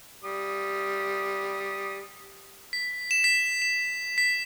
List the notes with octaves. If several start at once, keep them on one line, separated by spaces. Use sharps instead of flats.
G3 D#6
B6
E7
B6
E7
B6